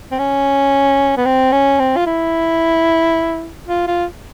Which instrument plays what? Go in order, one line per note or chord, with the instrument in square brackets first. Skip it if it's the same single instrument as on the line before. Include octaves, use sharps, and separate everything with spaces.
[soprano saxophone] C4
C#4
B3
C4
C#4
C4
F4
E4
F4
F4